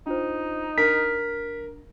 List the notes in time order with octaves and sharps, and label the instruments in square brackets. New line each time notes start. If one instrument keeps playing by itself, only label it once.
[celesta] D4 F4 C5 [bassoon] D#4
[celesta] D4 [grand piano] A#4 [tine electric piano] B6